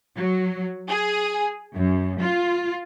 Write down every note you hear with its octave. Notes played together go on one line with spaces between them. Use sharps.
F#3
G#4
F#2
F4